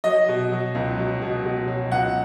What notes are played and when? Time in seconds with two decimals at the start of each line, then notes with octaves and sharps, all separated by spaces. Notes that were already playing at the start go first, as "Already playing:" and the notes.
0.04 F#3 D#5
0.28 B2
0.52 F#3
0.75 C#2
0.98 F#3
1.22 B2
1.45 B2
1.68 F#3
1.92 C#2 F#5